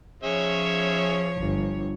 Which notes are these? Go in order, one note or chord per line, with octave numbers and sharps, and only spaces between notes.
F3 C#4 G#4 C#5 E5
G1